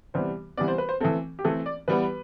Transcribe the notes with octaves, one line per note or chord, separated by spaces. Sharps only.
C3 E3 G3 B3 C5
C3 E3 G3 B3 D5
C5
B4
C5
E3 A3 C4 A4
G4
E3 A3 C4 A4
D5
E3 G3 B3 B4